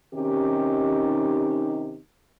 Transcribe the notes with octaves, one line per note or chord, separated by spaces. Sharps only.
C3 D#3 C#4 D#4 G4